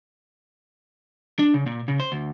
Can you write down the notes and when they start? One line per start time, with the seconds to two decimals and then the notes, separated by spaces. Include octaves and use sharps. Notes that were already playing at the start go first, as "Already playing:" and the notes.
1.39 D4
1.54 C#3
1.66 A#2
1.88 C#3
2.00 C5
2.12 D2